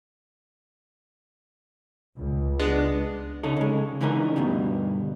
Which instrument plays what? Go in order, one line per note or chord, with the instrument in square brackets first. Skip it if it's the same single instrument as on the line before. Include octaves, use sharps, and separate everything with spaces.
[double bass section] C#2
[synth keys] G#3 B3 D4
[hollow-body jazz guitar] C#3 D#4 A4
C#3 G#3
D3 E3 C#4 D#4 A#4
D2 G2 B2 G3